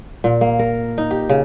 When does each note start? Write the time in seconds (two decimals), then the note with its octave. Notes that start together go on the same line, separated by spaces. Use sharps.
0.24 A#2
0.41 A#3
0.59 A#4
0.98 D#4
1.11 G4
1.29 C#3